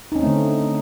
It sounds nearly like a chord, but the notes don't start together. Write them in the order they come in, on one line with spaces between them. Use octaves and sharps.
D#4 C#4 C4 A3 D3